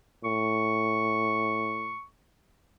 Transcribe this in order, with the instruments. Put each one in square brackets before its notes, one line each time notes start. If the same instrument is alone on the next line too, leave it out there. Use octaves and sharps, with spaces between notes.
[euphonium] A2 [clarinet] C#6